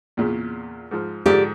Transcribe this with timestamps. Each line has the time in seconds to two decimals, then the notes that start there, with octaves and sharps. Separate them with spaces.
0.17 E2 A#2 C#3
0.91 G#2 F3
1.26 G#2 D3 F3 G4 D5